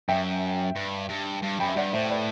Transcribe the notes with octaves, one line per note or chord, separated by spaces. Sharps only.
F#2 E5 G5
G2
G2
G2
F#2 G5 B5
E5
G2 D5 F#5
A2 C5 E5
B4 D5